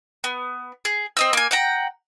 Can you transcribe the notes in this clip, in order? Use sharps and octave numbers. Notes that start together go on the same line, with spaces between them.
B3
G#4
C4 D#5 E6
A#3 G#5
F#5 G5 A#5